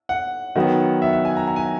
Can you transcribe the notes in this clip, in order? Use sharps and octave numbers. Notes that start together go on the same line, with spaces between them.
F#5
D#3 F#3 B3
E5
E5
G#5
A#5
A#5
G#5